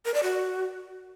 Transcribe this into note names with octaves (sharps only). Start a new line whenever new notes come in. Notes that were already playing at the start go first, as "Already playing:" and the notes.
A#4
D5
F#4